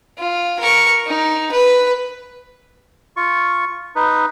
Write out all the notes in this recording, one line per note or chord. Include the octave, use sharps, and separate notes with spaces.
F4
A#4 C#6
D#4
B4
F4 C#6
D#4 B4